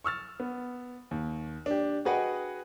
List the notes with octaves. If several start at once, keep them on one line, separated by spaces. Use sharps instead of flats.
C#6 E6 F6 A6
B3
D#2
D4 G4
F#4 G#4 B4 D#5 F#5 G5